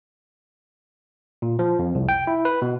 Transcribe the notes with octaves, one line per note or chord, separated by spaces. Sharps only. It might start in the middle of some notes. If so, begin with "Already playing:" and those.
A#2
F3
F2
C2
G5
E4
B4
B2